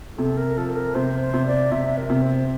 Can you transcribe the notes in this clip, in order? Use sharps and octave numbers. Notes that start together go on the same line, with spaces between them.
C3 A4
A#4
F3 A4
A#4
C3 C5
C5
C3
D5
C3 E5
A#4
C3
C5